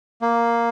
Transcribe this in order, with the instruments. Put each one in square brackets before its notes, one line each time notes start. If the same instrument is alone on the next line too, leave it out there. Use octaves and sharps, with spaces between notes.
[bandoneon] A#3